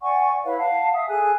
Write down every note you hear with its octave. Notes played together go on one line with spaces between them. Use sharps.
D5 F#5 G#5 C#6
E4 B4 C#5 F5
F5 F#5 A5
E5 D#6
G#4 A4 G#5 F#6